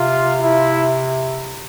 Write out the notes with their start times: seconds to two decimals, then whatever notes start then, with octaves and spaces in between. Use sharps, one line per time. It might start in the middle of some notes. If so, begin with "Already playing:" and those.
Already playing: C3 F4
0.41 E4